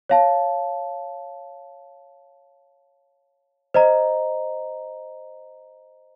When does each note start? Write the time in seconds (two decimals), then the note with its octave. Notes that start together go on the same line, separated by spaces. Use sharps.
0.09 C#5 F5 A5
3.74 C5 D#5 A#5